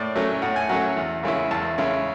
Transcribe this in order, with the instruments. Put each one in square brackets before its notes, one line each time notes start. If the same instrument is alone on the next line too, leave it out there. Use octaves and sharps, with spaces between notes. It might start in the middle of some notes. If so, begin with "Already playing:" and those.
Already playing: [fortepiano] A2 D5
F#3 A3 C#4
A2 F#5
G#5
F#3 A3 C#4 F#5
E2
C#3 G#3 C#4 E4
E2 A5
C#3 G#3 C#4 E4